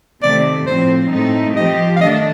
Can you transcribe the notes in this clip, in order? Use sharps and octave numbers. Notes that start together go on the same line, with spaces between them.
C3 D#3 A3 C4 D5
A2 F3 C4 C5
A2 A3 C4 D#4
F3 C4 G4 D#5
F5
D#3 A3 D4 D#5